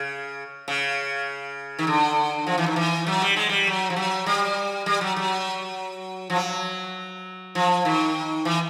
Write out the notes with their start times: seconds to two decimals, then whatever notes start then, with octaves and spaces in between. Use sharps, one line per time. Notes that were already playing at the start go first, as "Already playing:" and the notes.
Already playing: C#3
0.68 C#3
1.79 D#3
1.87 D3
2.47 F3
2.58 E3
2.66 D#3
2.76 E3
3.07 F#3
3.22 G3
3.36 G#3
3.49 G3
3.67 F#3
3.90 F3
3.96 F#3
4.26 G3
4.86 G3
5.01 F#3
5.16 F#3
6.30 F3
6.36 F#3
7.55 F3
7.85 D#3
8.45 E3